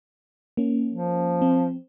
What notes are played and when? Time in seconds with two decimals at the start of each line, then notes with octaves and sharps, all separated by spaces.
0.57 A#3 C#4
0.90 F3
1.42 C4